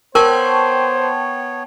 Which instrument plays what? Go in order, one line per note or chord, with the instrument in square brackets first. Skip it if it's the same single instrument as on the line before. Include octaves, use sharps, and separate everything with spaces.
[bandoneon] B3 C#5 [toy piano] A#4 [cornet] C5 [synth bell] G5 A5 C#6